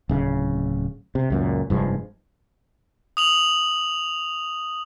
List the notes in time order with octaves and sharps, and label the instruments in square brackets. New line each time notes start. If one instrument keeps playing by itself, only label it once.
[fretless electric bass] D1 C#3
C3
C#2 F#2 A#2
F1 G2 F3 G#3
[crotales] D#6 F7 F#7